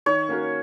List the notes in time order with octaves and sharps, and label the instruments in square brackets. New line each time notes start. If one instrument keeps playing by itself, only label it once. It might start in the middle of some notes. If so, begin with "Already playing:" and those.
[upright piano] D#3 [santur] C#5
[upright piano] A#3 C#4 F#4 A#4